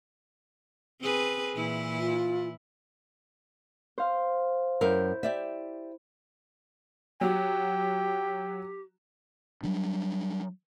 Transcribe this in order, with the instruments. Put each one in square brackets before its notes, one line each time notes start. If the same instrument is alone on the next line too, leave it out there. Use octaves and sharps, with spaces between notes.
[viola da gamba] C4 G#4 B4
A#2 E3 E4
[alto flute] F4
[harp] C5 F5
[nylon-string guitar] F#2 A#4 [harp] E4 G6
[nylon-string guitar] G4 D5 E5
[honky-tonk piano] F#3 F#4 [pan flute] G4 [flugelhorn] G5
[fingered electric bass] F#3 G3 D4